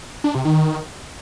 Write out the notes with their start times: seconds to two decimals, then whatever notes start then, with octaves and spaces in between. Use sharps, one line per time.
0.24 D4
0.34 C3
0.45 D#3